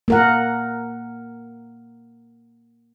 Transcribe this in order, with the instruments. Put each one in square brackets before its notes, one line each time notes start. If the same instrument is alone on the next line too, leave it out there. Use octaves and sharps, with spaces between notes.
[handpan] A#3 A#4 F#5